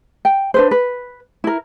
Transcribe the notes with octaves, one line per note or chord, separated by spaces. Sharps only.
G5
D4 B4 C5
B4
E4 A#4